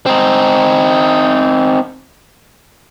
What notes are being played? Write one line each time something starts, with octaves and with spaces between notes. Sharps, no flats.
C4 D#4